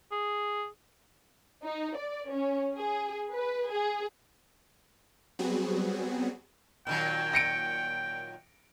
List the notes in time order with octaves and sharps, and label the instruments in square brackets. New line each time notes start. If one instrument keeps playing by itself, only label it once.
[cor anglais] G#4
[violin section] D#4
D5
C#4
G#4
B4
G#4
[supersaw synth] F#3 G3 B3 C4 F#4 G#4
[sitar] A#2 D#3 F#3 [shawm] G5
[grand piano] A#6 C#7 D7